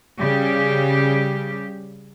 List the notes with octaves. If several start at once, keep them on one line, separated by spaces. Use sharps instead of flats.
C#3 G3 G4